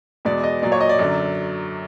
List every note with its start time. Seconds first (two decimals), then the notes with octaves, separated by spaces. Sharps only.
0.25 E2 B2 G#3 D5
0.43 D#5
0.62 A#2 F#3 D5
0.72 C#5
0.81 D#5
0.89 D5
0.99 F#2 D3 F#3